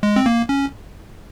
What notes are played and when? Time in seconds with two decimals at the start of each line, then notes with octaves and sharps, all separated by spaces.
0.03 G#3
0.16 C4
0.26 A#3
0.49 C#4